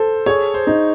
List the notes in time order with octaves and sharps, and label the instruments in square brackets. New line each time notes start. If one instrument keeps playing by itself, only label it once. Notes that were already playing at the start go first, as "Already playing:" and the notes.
Already playing: [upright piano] A4 [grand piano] C5
[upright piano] G#4 [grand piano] C#5
[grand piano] C5
[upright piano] D#4